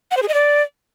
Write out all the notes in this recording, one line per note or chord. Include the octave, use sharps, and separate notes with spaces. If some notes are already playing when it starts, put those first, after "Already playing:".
F#5
C5
G#4
D#5
D5